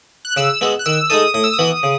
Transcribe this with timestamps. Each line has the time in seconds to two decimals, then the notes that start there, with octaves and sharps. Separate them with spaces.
0.25 F#6
0.37 C#3 E6
0.61 G#3 B3 F#4
0.79 F#6
0.86 D#3 E6
1.10 G#3 D#4 A4 D#6
1.34 A2 D#6
1.44 E6
1.53 D#6
1.59 E3 B3 F#4
1.83 C#3